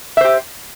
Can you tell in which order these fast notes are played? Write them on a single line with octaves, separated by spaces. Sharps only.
E5 C5 G4